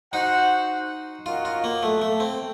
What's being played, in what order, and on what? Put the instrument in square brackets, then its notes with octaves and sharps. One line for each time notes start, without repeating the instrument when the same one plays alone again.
[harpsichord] D#4 [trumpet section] F#4 C5 F#5
[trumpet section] C#4 F#4 A#4 D#5 F#5 [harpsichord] F4
[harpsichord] F4
A#3
A3
A3
C4